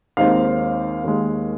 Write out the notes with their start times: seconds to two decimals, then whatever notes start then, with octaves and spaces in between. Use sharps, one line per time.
0.17 D#2 D#3 G#3 C4 F5
1.04 D#2 D#3 G#3